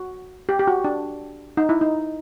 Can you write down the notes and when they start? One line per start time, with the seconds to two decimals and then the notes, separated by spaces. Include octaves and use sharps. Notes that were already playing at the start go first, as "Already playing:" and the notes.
Already playing: F#4
0.49 G4
0.59 G4
0.67 F#4
0.84 D4
1.57 D#4
1.69 E4
1.81 D#4